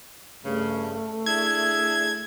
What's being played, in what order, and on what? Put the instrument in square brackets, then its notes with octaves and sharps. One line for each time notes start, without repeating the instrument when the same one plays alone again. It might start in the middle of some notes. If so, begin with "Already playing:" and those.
[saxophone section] G2 C#3 [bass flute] A3
[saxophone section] D4 E4 G#4 [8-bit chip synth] G#6